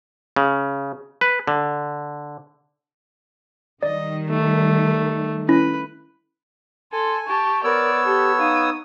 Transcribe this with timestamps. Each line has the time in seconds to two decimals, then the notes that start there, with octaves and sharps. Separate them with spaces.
0.36 C#3
1.21 B4
1.47 D3
3.83 D#3 G3 D5 D#5
4.30 A3
5.49 C#4 E4 B4 A#6
6.93 A4 G#5 C6
7.27 G4 A5 C#6
7.64 B3 A#4 C#5 D5 E6
8.06 G4 A4
8.39 D#4 F5 D#6